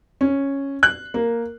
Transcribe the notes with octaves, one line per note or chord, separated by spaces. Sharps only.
C#4
F#6
A#3